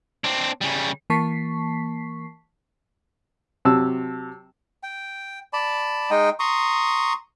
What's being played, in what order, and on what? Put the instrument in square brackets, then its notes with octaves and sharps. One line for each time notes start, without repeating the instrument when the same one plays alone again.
[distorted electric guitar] C4 D4
C#3 G3
[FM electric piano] E3 A#3 A5 C#6 B6 C7
[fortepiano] C3 F#3 A5 E6
[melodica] G5
D5 A5 B5
G#3 D#4 D#5 G5
A#5 C6 C#6 D#6